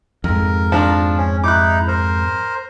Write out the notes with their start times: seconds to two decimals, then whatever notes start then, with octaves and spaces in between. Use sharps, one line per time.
0.24 F2 G#2 A#4
0.72 F3 D4 F6
1.17 C#4
1.44 D#4 E4 D6 F#6
1.88 A#4 C5